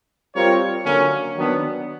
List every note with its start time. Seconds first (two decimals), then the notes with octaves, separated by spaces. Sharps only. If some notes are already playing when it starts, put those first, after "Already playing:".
0.34 G3 C4 F4 A#4 C#5
0.84 D3 F#3 A#3 C#4
1.36 D#3 F#3 B3 D4